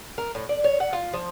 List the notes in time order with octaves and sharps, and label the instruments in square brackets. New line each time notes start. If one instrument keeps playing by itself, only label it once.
[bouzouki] A#4
A2
D5
C#5
F#5
F4
F3